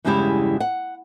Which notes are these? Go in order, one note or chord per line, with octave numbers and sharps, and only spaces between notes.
E2 G2 C#3 G#3 E4 G4
F#5